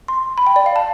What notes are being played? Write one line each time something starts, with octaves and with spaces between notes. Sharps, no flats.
C6
B5
G5
D5
F5
A5